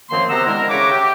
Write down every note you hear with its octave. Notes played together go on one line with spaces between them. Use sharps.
F#2 D#3 F3 A#3 C4 C6
C3 B3 C5 F#5 A#5 E6
D3 D#3 G#3 E4 A#4
C#3 C#5 E5 F#5 D6
G4